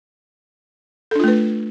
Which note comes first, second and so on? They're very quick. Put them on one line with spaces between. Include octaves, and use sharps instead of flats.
A4 D4 F4 A3 B4